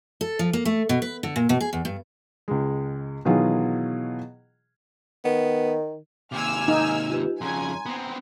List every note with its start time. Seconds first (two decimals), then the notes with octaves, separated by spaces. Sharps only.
0.21 A4
0.39 F3
0.53 A#3
0.65 A3
0.89 B2
1.02 B4
1.23 D3
1.36 A#2
1.49 B2
1.61 G#4
1.73 E2
1.85 G2
2.48 C#2 G#3
3.25 B2 D#3 E3 F#3 F4 G#4
5.25 D#3 B3
6.32 D#2 C3 G#5 D6 E6 F6
6.68 D#4
7.10 F4 G4 B4
7.41 F2 C#3 G#5 A#5 C6
7.86 B3 C4